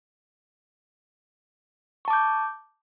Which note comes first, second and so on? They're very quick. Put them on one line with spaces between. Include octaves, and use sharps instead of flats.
C#6 A5 D6 G6